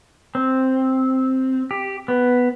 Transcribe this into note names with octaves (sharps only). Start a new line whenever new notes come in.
C4
G4
B3